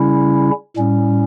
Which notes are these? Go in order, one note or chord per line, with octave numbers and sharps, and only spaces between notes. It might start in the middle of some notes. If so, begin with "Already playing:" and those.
Already playing: C#3 G3 C#4 E4
A2 G3 C#4